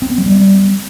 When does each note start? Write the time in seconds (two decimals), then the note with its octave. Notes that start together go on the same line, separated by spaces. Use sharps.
0.02 C4
0.10 B3
0.18 F#3
0.26 G3